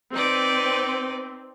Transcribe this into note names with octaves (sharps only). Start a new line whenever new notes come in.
C4 D#4 B4 D5